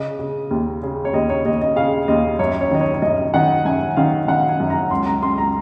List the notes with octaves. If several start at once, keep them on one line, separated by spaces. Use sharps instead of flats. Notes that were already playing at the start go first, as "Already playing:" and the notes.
Already playing: C#3 D#5
C#3
D#2
C#3
C#5
D#2 D#5
C#5
D#2 D#5
D#5
C#3 F5
D#2 D#5
F#2 C#5
C#5
D#3 D#5
C#5
C#5
F#2 D#5
D#3 F#5
F#2 G#5
D#3 F5
D#3 F#5
G#5
F#2
A#5
C#2 C6
A#5
C#2 C6
A#5